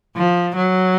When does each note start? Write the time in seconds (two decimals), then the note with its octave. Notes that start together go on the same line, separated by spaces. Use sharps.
0.16 F3
0.56 F#3